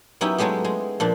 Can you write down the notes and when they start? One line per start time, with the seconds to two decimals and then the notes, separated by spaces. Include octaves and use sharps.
0.21 F#3 B3 C#4 D#4 E4 G4
0.38 F#3 G#3 A3 B3 G4
0.65 G#3
1.00 A#2 F3 D4